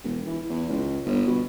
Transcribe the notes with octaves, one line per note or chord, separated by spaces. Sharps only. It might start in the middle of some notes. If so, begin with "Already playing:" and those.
E1
E3
E2
C#2
G1
B2